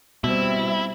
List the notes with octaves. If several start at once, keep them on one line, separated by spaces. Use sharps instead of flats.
B2 G3 C4 E4